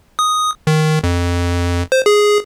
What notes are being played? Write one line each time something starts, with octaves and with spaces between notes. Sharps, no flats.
D#6
D#3
F2
C5
G#4